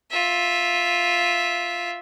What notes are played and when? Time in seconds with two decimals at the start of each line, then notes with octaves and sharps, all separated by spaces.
0.11 F4 E5